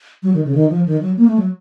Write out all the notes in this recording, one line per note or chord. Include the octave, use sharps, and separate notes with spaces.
F#3
D#3
C#3
D#3
F3
D#3
F#3
A#3
A3
F#3